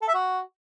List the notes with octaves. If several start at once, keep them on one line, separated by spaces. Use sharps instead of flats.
A4
E5
F#4